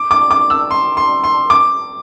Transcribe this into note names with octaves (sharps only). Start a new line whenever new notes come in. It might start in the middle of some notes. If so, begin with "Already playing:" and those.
Already playing: D6
D6
D6
E6
C6
C6
C6
D6